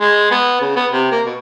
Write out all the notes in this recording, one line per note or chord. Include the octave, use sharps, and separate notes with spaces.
G#3
B3
C#3
B3
C3
A#3
B2